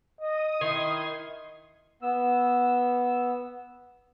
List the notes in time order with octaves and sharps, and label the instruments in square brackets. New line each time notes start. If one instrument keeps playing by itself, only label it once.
[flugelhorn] D#5 [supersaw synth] D#6
[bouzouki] D#3 [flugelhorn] E4 [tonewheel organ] C6 G#6
[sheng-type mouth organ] B3 E6